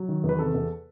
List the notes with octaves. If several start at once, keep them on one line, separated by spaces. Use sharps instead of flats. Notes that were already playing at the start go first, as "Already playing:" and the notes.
Already playing: F#3
D#3
E2
B4
C3 A4
E2